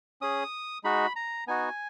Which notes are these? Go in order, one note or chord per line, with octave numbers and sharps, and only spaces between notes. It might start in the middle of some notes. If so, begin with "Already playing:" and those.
C#4 G#4 D#6
G#3 D#4 F#4 B5
A#5
B3 D#4 F#4 G#5